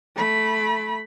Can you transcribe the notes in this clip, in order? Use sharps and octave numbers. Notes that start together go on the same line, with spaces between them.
A3 B5